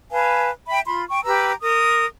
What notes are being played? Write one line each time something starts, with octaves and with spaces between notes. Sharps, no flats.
B4 F5 G#5 A5
E5 G5 B5
F4 B5 C6
G5 C#6
G4 B4 A#5 E6
A#4 D#6